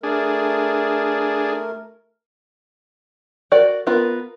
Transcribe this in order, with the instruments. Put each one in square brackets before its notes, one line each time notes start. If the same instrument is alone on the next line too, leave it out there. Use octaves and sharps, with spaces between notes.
[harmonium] A3 A#4 [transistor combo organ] D4 G#4
[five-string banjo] F#4 A#4 D5
B3 F4 A#4